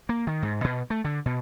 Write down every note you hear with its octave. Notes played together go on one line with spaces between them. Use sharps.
A#3
D#3
G#2
B2
A3
D3
B2